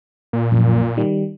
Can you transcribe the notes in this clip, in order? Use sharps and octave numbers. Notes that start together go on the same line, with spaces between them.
A#2
A#1 F#2
D#3 G3